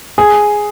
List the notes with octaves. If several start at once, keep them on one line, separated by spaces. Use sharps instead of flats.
G#4